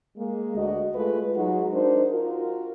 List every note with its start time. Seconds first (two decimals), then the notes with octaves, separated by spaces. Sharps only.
0.17 G#3 A#3
0.56 D2 F#4 D#5
0.94 G#3 A3 F4 B4
1.35 F#3 G#3 D#4 F#4
1.74 D4 D#4 A#4 C5
2.11 F4 F#4 A#4